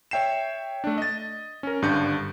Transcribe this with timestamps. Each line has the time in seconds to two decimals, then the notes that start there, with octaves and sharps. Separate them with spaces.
0.11 C#5 E5 G5 C7 E7
0.84 A3 D4
0.98 D#5 A6
1.63 C#4 A#4
1.82 G#1 G2 D3 G6 C#7